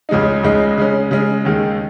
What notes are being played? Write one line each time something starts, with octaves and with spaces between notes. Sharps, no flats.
C#2 C#3 G#3 D#4
C#2 C#3 G#3 D#4
C#3 G#3 C#4
C#3 G#3 C#4
D#2 D#3 G#3